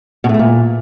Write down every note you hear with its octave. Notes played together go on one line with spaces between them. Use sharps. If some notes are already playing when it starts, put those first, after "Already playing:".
B2
A2
A3
A#2